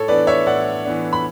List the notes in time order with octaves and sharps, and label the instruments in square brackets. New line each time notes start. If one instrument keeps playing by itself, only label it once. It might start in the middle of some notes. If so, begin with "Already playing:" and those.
Already playing: [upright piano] A2 A4 C#5
E3 B3 D4 B4 D5
C#5 E5
A2 D5 F#5
E3 B3 D4
B5